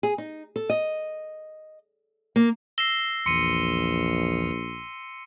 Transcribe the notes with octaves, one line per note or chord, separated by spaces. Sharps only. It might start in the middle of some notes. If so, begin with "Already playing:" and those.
G#4
D#4
A4
D#5
A#3
E6 A#6 C7 E7 G7
A#1 E2 E3 C6 C#7 D#7